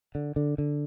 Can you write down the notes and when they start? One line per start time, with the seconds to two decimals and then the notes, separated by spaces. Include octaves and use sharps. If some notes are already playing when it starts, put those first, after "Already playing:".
0.15 D3
0.36 D3
0.58 D3